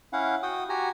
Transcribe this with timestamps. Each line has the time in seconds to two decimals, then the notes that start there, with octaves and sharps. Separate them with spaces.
0.13 C#4 E4 F5 F#5
0.43 F#4 G5 D#6
0.69 F#4 G4 G#5 A#5